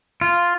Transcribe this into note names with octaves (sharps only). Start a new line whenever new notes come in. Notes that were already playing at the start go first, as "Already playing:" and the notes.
F4